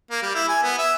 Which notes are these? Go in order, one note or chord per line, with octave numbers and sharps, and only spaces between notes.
A#3
G3
E4
G#5
B3
E5